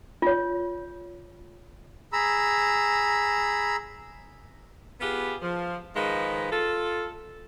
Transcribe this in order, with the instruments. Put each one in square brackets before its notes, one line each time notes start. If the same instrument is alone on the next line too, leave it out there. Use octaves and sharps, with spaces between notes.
[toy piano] F4 C#5
[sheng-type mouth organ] G#4 A#5 B5 E6
[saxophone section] B3 F4 G4 G#4 B4
F3
D#3 F3 G#3 G#4 B4
F4 A4